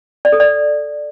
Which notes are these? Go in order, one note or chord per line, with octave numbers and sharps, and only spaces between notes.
D5
A4
D5